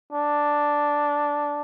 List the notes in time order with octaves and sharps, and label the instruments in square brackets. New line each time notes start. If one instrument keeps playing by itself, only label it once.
[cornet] D4